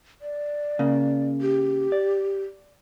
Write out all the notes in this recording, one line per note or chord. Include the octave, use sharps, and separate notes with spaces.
D5
C#3 A#3
G4
D5